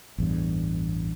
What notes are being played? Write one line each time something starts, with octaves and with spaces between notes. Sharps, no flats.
A1 E2 G2